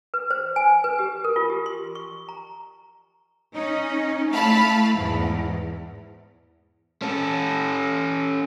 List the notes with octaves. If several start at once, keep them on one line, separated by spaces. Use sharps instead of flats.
B4
C5
G#5
B4
G4
A#4
F4
G4
C6
C#6
A#5
C#4 D#4
A3 E4 F5 A5 B5
E2 G#2
C#4 A4